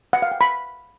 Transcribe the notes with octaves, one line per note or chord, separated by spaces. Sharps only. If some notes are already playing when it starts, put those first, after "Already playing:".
F#5
F5
G5
B5